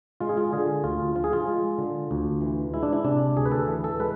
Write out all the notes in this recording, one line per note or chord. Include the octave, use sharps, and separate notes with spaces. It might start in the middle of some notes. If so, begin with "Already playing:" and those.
G#3 F4
G#4
F4
D3 G#4
D2 F4
F3 F4
G#4
F4
G#3
D3
D2
E3
G#3 E4
D4
E4
C3 D4
D2 G#4
B4
A4
E3
A4
G#3 B4